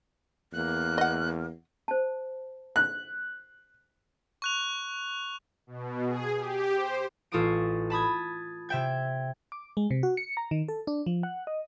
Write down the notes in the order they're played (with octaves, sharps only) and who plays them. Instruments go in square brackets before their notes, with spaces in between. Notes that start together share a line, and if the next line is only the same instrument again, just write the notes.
[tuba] E2 [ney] A#3 [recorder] F#6
[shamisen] D#5 F#5
[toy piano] C5 A5
[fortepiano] F#6
[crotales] C#6 F#6 F7
[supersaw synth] B2
G#4
G4
C5
[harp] A1 F4 A4 C#6 D#6 D7
A5 B5 D#6 G#6
C3 E5 G5 G#6
[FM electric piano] D6
G#3
C3
F#4
C#7
A#5
D#3
A4
D4
F3
F#5
D#5